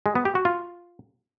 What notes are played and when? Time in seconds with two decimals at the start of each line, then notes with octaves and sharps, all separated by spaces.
0.06 G#3
0.15 B3
0.25 G4
0.35 F#4
0.45 F4